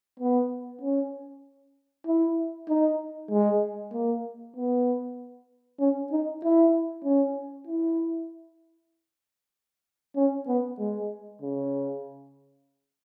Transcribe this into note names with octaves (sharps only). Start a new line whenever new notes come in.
B3
C#4
E4
D#4
G#3
A#3
B3
C#4
D#4
E4
C#4
E4
C#4
B3
G#3
C#3